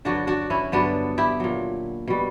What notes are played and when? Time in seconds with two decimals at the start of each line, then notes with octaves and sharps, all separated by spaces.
0.05 G2 D3 F#3 D4 F#4
0.27 D4 F#4
0.50 C#4 E4
0.72 G2 D3 F#3 B3 D4
1.18 E4 G4
1.40 A#2 F#3
2.08 B2 G3